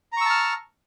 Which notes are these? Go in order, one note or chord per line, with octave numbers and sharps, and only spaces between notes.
A5 A#5 C#6 E6 F6